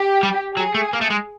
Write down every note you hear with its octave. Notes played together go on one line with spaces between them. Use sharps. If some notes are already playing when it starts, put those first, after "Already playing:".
Already playing: G4
G3
F#3 G#4
A3
A#3
A3
G#3